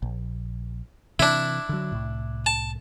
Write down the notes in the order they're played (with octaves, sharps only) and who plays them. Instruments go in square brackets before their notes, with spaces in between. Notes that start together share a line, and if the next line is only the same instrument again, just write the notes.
[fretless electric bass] A#1
[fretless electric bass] C3 E3 [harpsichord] D4 E4
[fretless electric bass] D3 F#3
C2 A2
[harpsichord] A5